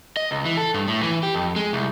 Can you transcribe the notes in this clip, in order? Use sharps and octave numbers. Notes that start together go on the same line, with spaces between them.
D#5
C#2
E3
A4
G2
A2
E3
G4
F2
G#3
C2